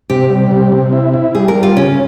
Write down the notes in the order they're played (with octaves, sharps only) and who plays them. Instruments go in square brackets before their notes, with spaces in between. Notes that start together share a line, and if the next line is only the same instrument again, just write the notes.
[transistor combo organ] C3 [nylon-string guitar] G4
[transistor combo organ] G3
C3
C3
E4
E4
[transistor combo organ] G3 [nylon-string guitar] G#4
[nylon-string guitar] A#4
[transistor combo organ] G3
[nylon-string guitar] F4
[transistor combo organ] C#3 [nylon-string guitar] C#4